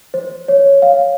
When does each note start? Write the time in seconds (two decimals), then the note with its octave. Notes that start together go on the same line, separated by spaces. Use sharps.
0.14 C5
0.48 C#5
0.82 F5